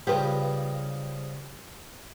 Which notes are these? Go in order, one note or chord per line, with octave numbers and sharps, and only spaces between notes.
G2 C#3 F3 G4 B4